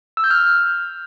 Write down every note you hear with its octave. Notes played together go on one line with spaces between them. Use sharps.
E6
G6
F6